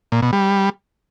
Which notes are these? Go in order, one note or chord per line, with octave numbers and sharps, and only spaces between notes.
A#2
B2
G3